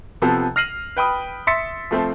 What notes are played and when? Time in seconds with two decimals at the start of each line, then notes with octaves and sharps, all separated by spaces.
0.22 C3 F3 B3 A4
0.56 F6 A#6 C7 D#7 F#7
0.97 B4 G5 B5 D#6
1.47 E5 C6 E6 A6 B6 C#7
1.91 F3 A3 C4